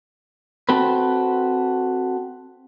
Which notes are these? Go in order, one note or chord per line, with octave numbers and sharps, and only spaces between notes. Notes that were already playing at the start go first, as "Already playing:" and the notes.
C4 F#4 A4 B4